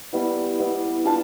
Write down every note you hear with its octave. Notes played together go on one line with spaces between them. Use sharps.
G3 B3 E4
G3 B3 E4
G3 D4 F4 A5